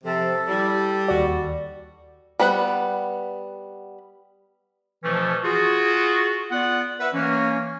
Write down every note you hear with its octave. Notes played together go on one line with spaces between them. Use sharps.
C3 F3 A4
G3 E4
D#2 F#4 D5
G3 B3 B4 F#5
B2 E3 F3 A3 C#4 B4
F4 F#4 G#4
B3 F4 D5 F#5
B4 E5 F#5
E3 A#3 C#4